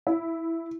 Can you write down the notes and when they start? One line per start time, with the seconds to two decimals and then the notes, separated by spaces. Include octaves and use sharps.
0.07 E4